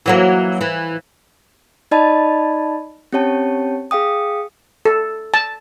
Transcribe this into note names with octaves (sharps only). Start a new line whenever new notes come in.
E3 F#3 A#3
E3
D#4 D5 D#5 A5 B5
C4 C#4 G4 C#5 G5 A5
G#4 F5 G5 D#6
A4
A5